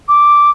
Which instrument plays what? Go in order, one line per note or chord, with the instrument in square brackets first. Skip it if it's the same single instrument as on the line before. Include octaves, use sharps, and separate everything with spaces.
[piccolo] D6